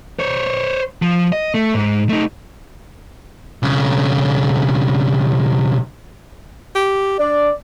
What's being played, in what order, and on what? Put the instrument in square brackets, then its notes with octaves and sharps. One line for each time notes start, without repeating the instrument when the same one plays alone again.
[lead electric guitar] C5 C#5
F3
D#5
A3
G#2
A3 D#4
B1 C#3
[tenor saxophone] G4
[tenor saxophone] D4 [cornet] D5